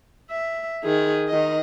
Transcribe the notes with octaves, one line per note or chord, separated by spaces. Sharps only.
E5
D#3 G#4
D#3 D#5